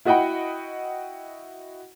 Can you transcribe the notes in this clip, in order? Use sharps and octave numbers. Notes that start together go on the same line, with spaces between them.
E4 F#4 D#5 F#5 G5 B5